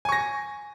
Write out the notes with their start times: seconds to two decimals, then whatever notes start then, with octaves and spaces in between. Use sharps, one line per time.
0.05 G#5
0.09 C#6
0.12 A#6